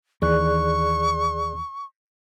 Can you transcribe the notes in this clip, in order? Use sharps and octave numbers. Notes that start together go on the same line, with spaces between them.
D#2 E3 G#4 D5 C#6 F#6